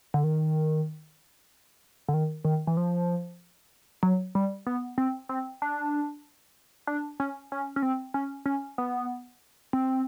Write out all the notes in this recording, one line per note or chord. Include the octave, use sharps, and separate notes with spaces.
D3
D#3
D3
D#3
D#3
E3
F3
F#3
G3
B3
C4
C4
D4
D4
C#4
C#4
C#4
C4
C#4
C#4
B3
C4